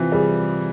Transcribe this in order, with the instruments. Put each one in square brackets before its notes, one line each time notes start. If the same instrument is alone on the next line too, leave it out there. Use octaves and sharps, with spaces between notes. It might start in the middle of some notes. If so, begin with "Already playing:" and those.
Already playing: [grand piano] C3 E3 [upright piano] F3
[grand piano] G3 [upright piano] G#4